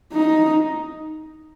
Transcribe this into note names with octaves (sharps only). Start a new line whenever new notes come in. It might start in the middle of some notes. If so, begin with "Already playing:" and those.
D#4